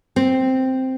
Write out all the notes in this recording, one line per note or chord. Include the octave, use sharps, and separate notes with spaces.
C4